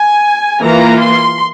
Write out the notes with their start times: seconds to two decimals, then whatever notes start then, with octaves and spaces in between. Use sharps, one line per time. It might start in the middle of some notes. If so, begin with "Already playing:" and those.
Already playing: G#5
0.61 E3 A#3 F4 A#5
0.98 C6